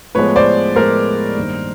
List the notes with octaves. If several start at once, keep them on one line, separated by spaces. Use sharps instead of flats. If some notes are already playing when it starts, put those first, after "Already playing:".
A2 F3 G#3 B3 B4 C#5
C5 D5
A2 F3 G#3 B3 A#4 C5
G2 D#3 G3 A#3